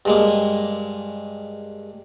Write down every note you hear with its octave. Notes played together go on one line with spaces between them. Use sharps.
G2 G#3 A#3